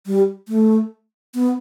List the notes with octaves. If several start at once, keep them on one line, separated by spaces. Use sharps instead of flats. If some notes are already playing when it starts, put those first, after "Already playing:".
G3
A3
B3